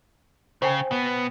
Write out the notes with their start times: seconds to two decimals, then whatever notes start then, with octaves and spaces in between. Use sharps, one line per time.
0.62 C#3 C5 G5 G#5
0.91 B2 B3